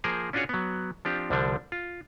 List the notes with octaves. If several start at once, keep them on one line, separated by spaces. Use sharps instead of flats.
F3 A#3 G#4 A#4 C5
C#4 D4 F4 F#4 G#4 C#5
F#3 B3
F3 C4 D4 F4 G4
C2 D3 F3 G3 D4
F4